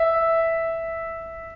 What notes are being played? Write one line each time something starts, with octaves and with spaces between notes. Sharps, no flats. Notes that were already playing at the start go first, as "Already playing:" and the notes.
Already playing: E5